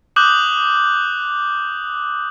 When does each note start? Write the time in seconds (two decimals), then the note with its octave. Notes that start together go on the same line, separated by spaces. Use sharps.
0.16 D6 D#6 F#6 G6 F#7